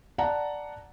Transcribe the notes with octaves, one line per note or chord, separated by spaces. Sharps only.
D5 F#5 A5 A#5